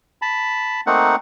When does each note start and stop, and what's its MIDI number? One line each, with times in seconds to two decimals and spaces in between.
0.22 0.81 81
0.22 0.81 83
0.87 1.16 57
0.87 1.16 58
0.87 1.16 60
0.87 1.16 63
0.87 1.16 78